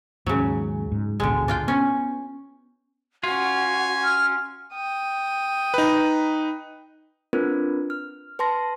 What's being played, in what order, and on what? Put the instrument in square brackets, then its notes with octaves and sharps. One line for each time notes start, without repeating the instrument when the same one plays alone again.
[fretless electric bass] D#2 G#2 [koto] C#3 F#3
[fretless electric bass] G#2
[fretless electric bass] D1 G#1 B2 [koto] D3 G#3
[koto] D4 F4 G5
[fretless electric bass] B3 [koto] C#4
[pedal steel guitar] C#4 F4 [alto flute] F#4 [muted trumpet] G#5
[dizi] F6
[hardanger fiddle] G5 D#6
[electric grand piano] D#4 B4
[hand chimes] C4 D4 F4 A#4 B4
F6
B4 A5 C6 A#6